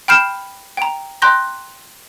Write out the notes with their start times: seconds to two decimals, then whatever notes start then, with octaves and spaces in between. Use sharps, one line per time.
0.08 G5 B5 F6 G6 C7 E7
0.77 G5 A#5
1.22 G5 A#5 C6 F#6 G6 A#6